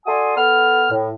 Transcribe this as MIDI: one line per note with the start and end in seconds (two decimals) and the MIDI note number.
0.06 0.35 66
0.06 0.35 69
0.06 0.35 74
0.06 0.35 80
0.06 0.35 84
0.06 0.35 87
0.37 0.88 59
0.37 0.88 69
0.37 0.88 89
0.91 1.12 45